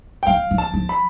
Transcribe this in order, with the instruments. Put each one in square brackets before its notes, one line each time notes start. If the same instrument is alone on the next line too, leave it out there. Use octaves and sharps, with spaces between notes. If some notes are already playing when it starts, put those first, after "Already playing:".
[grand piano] G5
[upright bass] F3 [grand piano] F5
[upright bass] F3
[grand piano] A5
[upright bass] F3
[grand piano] B5